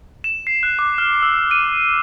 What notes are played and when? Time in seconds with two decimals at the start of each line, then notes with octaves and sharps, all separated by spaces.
0.24 E7
0.47 C7
0.63 F#6
0.79 D6
0.98 F6
1.23 E6
1.51 D#7